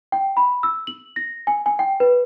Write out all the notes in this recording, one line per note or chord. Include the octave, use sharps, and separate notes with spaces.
G5
B5
E6
F#7
A#6
G#5
G#5
G5
B4